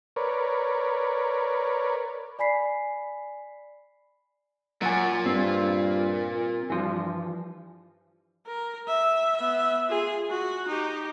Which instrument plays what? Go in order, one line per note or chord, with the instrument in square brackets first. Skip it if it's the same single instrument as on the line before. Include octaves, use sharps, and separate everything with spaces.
[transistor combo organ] A#4 B4 C#5 D5
[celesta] D5 G#5 B5 B6 C7
[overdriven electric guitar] A#2 [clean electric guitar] F#3 G#5
[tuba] G2 [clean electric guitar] C4
[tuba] G2 [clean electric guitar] E3 F3
[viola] A#4
E5
B3 E5
F4 G#4
F#4
D#4 G4